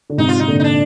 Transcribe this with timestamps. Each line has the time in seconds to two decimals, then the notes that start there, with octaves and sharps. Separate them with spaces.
0.10 D3
0.18 G#2 C3 D#4
0.29 F4
0.40 C3 D#4
0.48 A#2 D3
0.60 D#4
0.64 D4